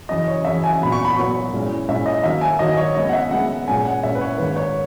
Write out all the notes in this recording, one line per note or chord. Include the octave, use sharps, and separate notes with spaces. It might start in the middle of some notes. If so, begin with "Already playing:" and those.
F#2 C#3 E3 D#5
C#5
F#2 C#3 E3 E5
G#5
A#2 F#3 B3 B5
C#6
B5
A#2 F#3 B3 C#6
A#2 G#3 C#4 E4
A#2 G#3 C#4 E4 E5
D#5
D#3 F#3 A#3 E5
G#5
D#3 F#3 A#3 D#5
C#5
C#3 G#3 B3 D#5
F#5
E5
C#3 G#3 B3 F#5
A#2 G#3 C#4 G#5
F#5
A#2 G#3 C#4 E5
B4
C#5
G#2 D#3 A#3 B4
C#5